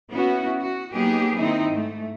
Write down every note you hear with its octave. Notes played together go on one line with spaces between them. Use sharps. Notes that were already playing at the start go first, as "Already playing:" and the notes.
B3 C#4 E4 F#4
F#4
F#3 A#3 B3 D#4 G4 G#4
D#3 C4 D#4 E4
G#2 A3